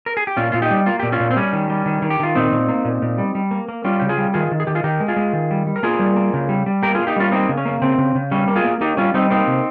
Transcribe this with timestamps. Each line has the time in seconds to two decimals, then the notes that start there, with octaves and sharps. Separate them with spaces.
0.06 A#4
0.17 G#4
0.27 G4
0.37 A#2 C#4 F4
0.52 A#2 F4
0.62 D#4 G4
0.71 G3
0.86 A#3 F4
1.00 A#2 G4
1.12 C#4 F4
1.20 A#2
1.31 C4
1.36 G3 C#4
1.53 D#3
1.70 G3
1.86 D#3
2.02 D#3
2.10 G4
2.20 D#3 F4
2.35 A#2 C4 D#4
2.52 A#2
2.69 A#3
2.85 A#2
3.02 A#2
3.18 G3
3.35 G3
3.51 A#3
3.69 A#3
3.84 G3 C#4 F4
4.00 C#3 G4
4.09 F4 G#4
4.18 G3
4.34 D#3 F4 G#4
4.52 D#3
4.60 G#4
4.67 D#3 G4
4.75 F4 G#4
4.84 D#3 G4 A#4
5.00 G#3
5.08 F4 G#4
5.17 G#3
5.33 D#3
5.51 G3
5.67 G3
5.76 A#4
5.83 A#3 F4 G#4
5.99 G3
6.16 A#3
6.34 C#3
6.49 G3
6.66 G3
6.83 A#3 G4 A#4
6.95 F4 G#4
7.00 A#3
7.07 D#4 G4
7.16 G3 C#4 F4
7.32 A#3 C4 D#4
7.49 C#3
7.57 C#4
7.65 A#3
7.82 C#3 C4
7.98 C#3
8.15 C#3
8.31 G3 C#4
8.48 A#3
8.56 F4 G#4
8.65 A#3
8.81 A#3 D#4 G4
8.97 G3 C#4 F4
9.14 G3 C4 D#4
9.30 A#3 C4 D#4
9.47 C3